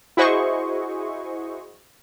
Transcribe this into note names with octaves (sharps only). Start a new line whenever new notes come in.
E4 F#4 G#4 C5 D#5 C#6